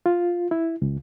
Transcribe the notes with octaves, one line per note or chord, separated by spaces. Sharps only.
F4
E4
C#2